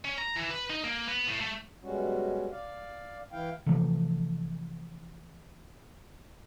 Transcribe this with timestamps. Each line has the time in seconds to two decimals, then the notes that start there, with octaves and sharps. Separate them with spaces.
0.05 C#4
0.18 A#5
0.36 E3
0.50 B4
0.70 D#4
0.84 A#3
1.08 B3
1.28 A2
1.41 A3
1.82 F#2 B2 G3 G#3 C#4 F#4
2.51 D5 F5
3.32 E3 E4 F5 G5
3.66 C3 E3 F3 A3